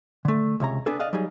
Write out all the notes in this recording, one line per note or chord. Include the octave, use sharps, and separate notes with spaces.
D3 A3
C#2 C3 C#5 A#5
B3 D4 G#4 A4
D5 D#5 F5 F#5
F#3 G3 D#4 G#4